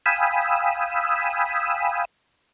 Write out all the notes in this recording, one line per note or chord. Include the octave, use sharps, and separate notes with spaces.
F5 G5 G#5 B5 D#6 E6